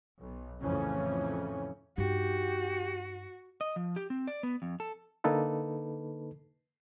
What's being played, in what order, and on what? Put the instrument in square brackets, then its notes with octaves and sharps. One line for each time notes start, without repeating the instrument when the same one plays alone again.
[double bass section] B1
F2 A2 C#3 E3 C#4
[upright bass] G2 D#4 [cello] F#4 [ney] G4
[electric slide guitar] D#5
F3
G4
C4
D5
B3
F2
A4
[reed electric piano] D3 A#3 D#4 A4 B4